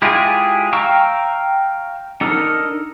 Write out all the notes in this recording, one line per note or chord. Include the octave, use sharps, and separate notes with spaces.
G#3 E4 F4 G4 G#4
F5 G5 A#5 C#6 E6
D4 D#4 A4 A#4